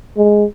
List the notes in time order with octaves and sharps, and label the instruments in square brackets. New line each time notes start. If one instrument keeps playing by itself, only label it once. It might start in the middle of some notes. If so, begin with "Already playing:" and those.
[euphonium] G#3